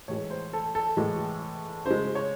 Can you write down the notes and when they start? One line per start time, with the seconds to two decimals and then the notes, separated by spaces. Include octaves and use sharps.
0.08 A2 E3 G#3 C#5
0.30 C5
0.53 A4
0.75 A4
0.97 A2 E3 G#3
1.86 C#3 G#3 C5
2.15 C#5